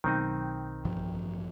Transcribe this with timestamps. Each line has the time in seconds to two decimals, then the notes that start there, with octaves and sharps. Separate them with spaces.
0.04 B1 D#3 C4 D#4 G5
0.85 A1 G2 F3